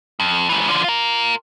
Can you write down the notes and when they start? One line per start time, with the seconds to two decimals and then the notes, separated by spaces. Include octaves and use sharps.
0.20 F2
0.49 G#2 E3
0.68 D3 F3
0.84 F4 A#4